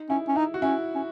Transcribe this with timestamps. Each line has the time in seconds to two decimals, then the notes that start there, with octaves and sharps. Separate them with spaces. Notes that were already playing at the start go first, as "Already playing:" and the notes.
Already playing: D#4
0.10 C#4 E4
0.28 C#4
0.36 D#4 E4
0.54 F#4
0.62 C#4 E4
0.95 C#4